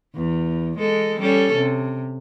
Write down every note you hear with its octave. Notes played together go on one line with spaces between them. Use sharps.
E2
G#3 A4
G3 C#4 A4
C3